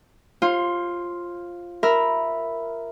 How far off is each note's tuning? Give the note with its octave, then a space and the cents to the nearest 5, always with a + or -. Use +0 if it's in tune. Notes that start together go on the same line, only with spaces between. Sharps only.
F4 +0 C5 +35
A#4 +0 E5 +0 B5 +0